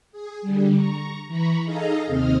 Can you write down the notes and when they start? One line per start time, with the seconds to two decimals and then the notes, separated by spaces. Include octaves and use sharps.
0.12 G#4
0.42 D3 G3
0.75 A#5 C#6
1.27 E3 A#5 B5 C#6
1.64 D#4 G#4 A4 D#5 F5 A#5
2.07 D#2 C3 C4 D#5 D#6 F6